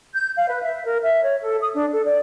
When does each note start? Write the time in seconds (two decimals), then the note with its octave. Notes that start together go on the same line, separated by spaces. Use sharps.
0.14 G6
0.37 F5
0.49 B4
0.62 E5
0.86 A#4
1.03 E5
1.23 C#5
1.43 A4
1.62 D#6
1.75 D4
1.93 A4
2.05 D5